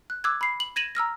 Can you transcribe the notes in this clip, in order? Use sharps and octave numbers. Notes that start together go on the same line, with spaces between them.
F#6
D6 E6 F#6 G#6
B5 C7
F#7
G#6 A#6 D#7 E7 F#7
A#5 E6 F6 A#6